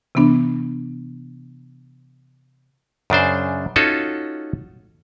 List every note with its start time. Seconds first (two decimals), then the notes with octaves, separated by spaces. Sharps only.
0.15 C3 E3 B3 D4
3.10 F#2 C#3 D4 C5
3.76 C#4 D#4 F4 F#4 A4